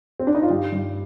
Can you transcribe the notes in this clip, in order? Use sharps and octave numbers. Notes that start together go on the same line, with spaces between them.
C4
D4
D#4
F4
G2 G4
G2